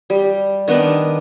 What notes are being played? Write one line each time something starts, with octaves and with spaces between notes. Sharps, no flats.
G3
D#3 B3 D4 D#4